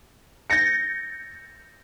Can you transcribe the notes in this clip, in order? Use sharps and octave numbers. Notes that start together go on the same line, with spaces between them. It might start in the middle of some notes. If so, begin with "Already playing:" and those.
G6 A6 A#6 C#7